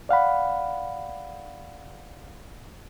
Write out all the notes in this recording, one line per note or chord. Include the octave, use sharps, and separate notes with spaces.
D5 F5 F#5 B5